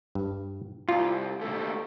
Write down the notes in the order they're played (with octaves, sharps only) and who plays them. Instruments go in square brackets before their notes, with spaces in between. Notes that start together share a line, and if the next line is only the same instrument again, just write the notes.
[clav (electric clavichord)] G2
[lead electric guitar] C2 [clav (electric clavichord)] F4
[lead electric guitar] D#2 A3